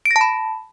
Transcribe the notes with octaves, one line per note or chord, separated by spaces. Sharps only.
D7
A#6
A5
B5